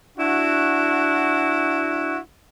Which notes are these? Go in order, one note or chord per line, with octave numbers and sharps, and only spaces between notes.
D4 E4 F#4